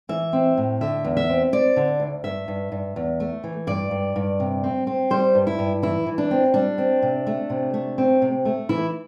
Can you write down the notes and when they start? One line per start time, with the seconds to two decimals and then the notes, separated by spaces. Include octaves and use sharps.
0.09 E3 E5
0.33 C4
0.57 A2
0.81 D3 E5
1.04 E2
1.17 E5
1.29 C4
1.52 C4 D5
1.76 D3
2.00 D2
2.24 G2 E5
2.48 G2
2.72 G2
2.96 E2
3.20 A3
3.44 E3
3.67 G2 D5
3.91 G2
4.16 G2
4.40 C3
4.64 C4
4.87 C4
5.10 G3 C5
5.35 G2
5.47 E4
5.59 G2
5.83 E3 E4
6.07 E3
6.18 D4
6.31 C4
6.54 G3 D4
6.78 C4
7.03 C3
7.27 A3
7.50 C3
7.74 A3
7.98 C4
8.22 C3
8.45 A3
8.69 E3 E4